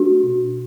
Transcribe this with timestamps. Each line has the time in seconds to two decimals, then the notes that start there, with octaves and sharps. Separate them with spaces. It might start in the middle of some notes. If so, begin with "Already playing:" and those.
Already playing: A3 D4 F#4
0.23 B2